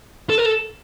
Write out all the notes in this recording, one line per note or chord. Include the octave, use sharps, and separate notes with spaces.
A4
A#4
A4